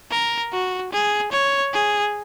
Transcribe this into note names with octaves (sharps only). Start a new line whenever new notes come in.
A#4
F#4
G#4
C#5
G#4